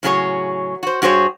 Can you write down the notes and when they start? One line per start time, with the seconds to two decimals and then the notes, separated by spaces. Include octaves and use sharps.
0.03 A2 C#3 F#3 G#4 B4 C#5
0.83 F#4 C5
1.02 G2 F#4 G#4 C5 C#5